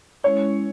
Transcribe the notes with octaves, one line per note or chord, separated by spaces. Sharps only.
G#3 C#4 E4 C#5